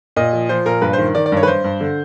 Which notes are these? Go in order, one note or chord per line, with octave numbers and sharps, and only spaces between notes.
A#2 D#5
F3
F3 C5
A#2 A#4
G2 B4
D#3 C5
D#3 D5
D5
G2 C#5
B4
G2 C5
G2
D3